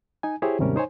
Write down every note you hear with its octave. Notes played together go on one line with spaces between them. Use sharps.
D#4 G#5
E4 G4 G#4 C5 C#5
D#2 G#2 C3 G3 C#4 A#4
D#4 C5 C#5 G#5